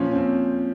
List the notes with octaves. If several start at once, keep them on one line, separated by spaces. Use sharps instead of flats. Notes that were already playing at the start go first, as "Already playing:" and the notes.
Already playing: A#2 F3 C#4
C#4
C4